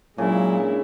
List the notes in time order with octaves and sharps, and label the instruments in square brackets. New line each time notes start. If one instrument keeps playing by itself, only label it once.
[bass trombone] A#2 [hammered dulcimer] C#3 [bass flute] F#3 [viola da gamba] G#3 D4 E4